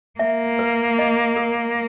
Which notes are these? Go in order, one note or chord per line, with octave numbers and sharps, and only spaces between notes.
A#3 E5
B4
D#5
A#4